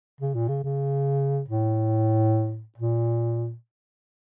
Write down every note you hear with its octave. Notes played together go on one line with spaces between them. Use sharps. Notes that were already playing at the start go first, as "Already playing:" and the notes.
C#3
A#2
C#3
C#3
A2
A#2